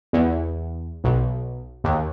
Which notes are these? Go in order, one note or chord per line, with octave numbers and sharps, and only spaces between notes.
E2
B1
D#2